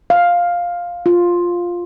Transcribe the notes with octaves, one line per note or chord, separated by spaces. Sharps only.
F5
F4